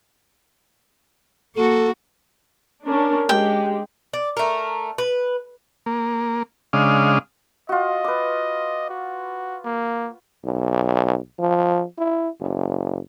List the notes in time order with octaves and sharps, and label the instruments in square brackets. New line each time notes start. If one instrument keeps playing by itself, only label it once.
[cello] A#3 F#4 [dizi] A4
[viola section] C#4 D4 A#4
[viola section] G#3 G4 [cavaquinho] G5
[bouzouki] D5
A3 A#4
B4
[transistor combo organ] A#3
C#3 G#3 D4 D#5 F5
[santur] F4 F#4 [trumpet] D#5
[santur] B4 D6
[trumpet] F#4
A#3
[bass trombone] B1
F3
E4
F#1